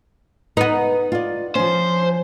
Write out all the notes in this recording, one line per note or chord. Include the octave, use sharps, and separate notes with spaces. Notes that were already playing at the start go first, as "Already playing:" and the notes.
B3 D#4 B4
F4 D5
F3 C#4 C5